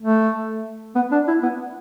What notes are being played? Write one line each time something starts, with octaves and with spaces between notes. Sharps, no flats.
A3
B3
D4
E4
B3